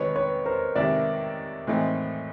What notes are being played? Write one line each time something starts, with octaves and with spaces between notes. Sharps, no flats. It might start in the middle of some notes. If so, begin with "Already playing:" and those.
Already playing: C3 D#3 G#3 B4 C#5
B4 C#5
A#4 C5
C3 D#3 G#3 D5 E5
A2 E3 G#3 C4 D#4